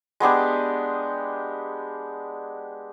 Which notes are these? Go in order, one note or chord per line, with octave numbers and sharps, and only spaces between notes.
G#3 B3 D4 G4